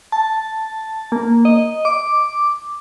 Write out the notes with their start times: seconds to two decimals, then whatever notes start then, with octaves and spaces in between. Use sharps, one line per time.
0.12 A5
1.12 A#3
1.45 D#5
1.85 D6